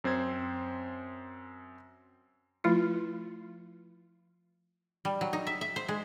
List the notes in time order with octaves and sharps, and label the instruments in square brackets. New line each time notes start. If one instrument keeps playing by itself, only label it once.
[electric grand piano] F#2 C4 C5 G#6
[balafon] F3 A3 E4 F4
[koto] G3
F#3
D#4
E5
E5
C5
G#3